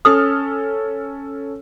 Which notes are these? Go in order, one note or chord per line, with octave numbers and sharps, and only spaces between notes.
C#4 A4 D#6 F6